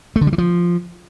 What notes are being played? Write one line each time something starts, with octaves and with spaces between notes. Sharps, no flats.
A3
D3
G3
E3
F3